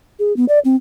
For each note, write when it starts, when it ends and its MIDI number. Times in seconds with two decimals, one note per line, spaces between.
0.19 0.35 68
0.37 0.45 59
0.49 0.59 74
0.65 0.76 60